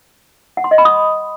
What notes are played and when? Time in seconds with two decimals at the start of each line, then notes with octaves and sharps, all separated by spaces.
0.57 F#5
0.64 C6
0.71 D#5
0.78 B5
0.85 D#6